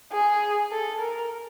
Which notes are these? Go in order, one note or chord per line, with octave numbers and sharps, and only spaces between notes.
G#4
A4
A#4